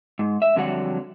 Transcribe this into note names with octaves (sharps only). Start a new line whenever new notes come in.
G#2
E5
F2 D3 F#3 G3 F#5